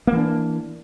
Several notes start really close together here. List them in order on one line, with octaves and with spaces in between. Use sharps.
A#3 E3 D4